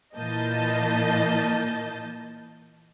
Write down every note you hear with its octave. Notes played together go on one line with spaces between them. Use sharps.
A#2 E3 A#3 D#5 A5 G6